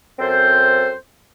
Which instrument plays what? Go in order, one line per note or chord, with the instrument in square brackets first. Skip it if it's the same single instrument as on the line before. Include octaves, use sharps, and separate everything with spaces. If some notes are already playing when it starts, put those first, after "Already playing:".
[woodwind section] F#2 C4 A4 C5